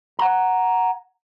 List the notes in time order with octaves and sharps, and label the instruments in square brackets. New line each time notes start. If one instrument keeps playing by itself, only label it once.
[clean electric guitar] F#5 A#5